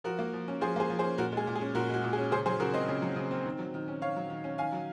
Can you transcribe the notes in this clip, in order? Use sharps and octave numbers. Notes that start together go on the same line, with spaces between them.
F3 F#4 A#4
A#3
F3
C#4
F3 G#4 C5
A#3 G#4 C5
F3
G#4 C5
C#4
A#2 F#4 A#4
G#3 G#4
A#2
G#4
C#4
A#2 F#4 A#4
G#3 F#4
A#2
G#4
C#4
C#3 G#4 C5
F#3 G#4 C5
C#3 F#4 A#4
C4 C5 D#5
C#3
F#3
C#3
C4
D#3
F#3
D#3
C#4
D#3 C#5 F5
F#3
D#3
C#4
D#3 F5 G#5
F#3